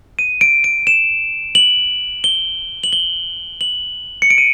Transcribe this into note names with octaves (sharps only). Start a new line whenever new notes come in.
D#7
D7
D7
E7
F#7
G7
F#7
G7
F#7
C#7
D7
D#7